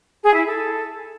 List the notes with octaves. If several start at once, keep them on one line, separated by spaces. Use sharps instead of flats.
G#4
E4
A4